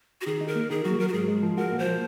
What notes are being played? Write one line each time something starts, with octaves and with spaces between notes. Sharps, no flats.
F#4
D#3 G#4
D#4
A#4
A#3
D#3 G#4
F#3 F#4
F#3 A#4
F#4
G#2 G#4
G#3
F3
F#4 A#4
A#2
C5
F3